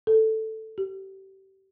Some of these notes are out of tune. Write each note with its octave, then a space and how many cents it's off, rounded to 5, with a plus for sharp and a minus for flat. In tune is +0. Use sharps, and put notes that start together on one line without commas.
A4 +5
G4 -30